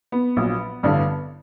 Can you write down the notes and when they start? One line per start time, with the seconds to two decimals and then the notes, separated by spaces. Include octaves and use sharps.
0.12 B3
0.37 A#1 A#2 F#3
0.83 A1 G2 D3